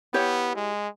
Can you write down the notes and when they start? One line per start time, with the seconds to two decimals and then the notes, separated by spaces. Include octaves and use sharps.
0.14 B3 E4 G4 C#5
0.56 G#3